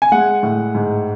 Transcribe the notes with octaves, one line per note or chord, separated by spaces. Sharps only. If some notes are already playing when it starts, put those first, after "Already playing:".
G#5
G#3 F#5
A2
G#2